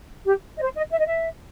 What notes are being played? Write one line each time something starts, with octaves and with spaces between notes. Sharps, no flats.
G4
D#5
C5
D#5
E5
D#5
E5